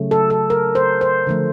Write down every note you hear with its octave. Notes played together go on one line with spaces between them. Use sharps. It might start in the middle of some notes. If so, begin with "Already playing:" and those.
Already playing: C#3 F#3 A3
A4
A4
A#4
C5
C5
D3 F3 A3